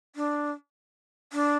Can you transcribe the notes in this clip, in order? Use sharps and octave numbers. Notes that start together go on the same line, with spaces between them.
D4
D4